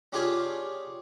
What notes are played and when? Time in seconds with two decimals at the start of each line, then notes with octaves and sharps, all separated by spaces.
0.13 C#4 D4 F4 G4 G#4 G#5